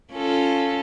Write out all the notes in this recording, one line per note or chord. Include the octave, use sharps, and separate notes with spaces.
C#4 F4 A4